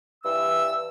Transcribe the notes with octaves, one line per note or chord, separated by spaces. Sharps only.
G2 E3 E6